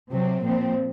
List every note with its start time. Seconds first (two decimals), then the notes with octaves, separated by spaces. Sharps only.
0.11 C3 F#3 C4
0.42 A#2 F3 C4